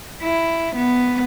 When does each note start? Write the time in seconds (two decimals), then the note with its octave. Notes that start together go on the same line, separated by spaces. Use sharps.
0.23 E4
0.76 B3